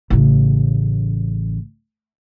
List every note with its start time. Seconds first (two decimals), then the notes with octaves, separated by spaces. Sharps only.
0.10 A1 C#3